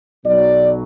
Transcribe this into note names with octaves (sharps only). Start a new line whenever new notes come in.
B1 B2 F#3 D5